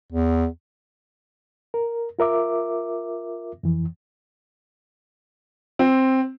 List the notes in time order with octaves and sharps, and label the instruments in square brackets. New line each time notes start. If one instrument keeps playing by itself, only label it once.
[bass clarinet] E2
[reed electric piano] A#4
F4 A#4 E5 D6
F2 E3
[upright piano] C4